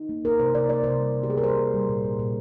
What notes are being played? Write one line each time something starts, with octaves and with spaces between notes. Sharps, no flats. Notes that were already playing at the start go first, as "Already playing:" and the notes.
Already playing: D#4
A#3
A#3 A#4
C3 C5
C3 D5
A#3 D5
C3 C5
G3
C3
G4
A#3 G#4
A#4
G3 C5
A#3
G3
A#2
A#2
A#2